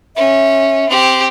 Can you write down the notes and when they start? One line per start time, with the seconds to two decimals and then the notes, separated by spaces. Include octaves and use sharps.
0.16 C#4 E5
0.89 C4 G4